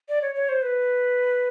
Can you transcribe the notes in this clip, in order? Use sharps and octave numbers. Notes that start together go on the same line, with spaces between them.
D5
C#5
C#5
C5
B4